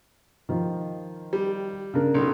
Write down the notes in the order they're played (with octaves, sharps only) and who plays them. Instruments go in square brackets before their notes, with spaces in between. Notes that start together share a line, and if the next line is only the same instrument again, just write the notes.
[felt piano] D#3 F3
[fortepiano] G3
[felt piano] C#3 D4 A#4
[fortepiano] B1 B2